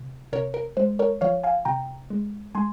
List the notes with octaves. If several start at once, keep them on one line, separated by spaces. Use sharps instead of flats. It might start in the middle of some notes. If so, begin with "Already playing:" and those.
Already playing: C3
C3 A#4 C#5
A#4
G#3 C5
A#4 C#5
F3 C#5 F5
F5 G#5
C3 G5 A#5
G#3
G#3 G#5 C6